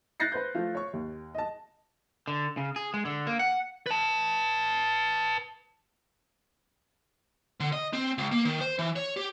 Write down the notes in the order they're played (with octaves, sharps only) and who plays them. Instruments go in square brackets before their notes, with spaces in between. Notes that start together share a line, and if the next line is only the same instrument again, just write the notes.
[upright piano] F#6 G6 A6 A#6 C7 C#7
B4 C5 G6
F3 A3 F4
C#5 C#6
D#2
D#5 A5
[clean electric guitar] D3
C#3
G#4
G#3
D3
A#3
F#5
[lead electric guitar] B4 A5
D3
D#5
C4
C#2
A#3
D#3
C5
E3
C#5
G4